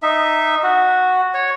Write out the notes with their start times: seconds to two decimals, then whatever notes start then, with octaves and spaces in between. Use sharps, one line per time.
0.02 D#4 E5
0.63 F#4
1.34 C#5